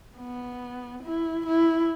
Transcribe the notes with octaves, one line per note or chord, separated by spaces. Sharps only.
B3
E4
E4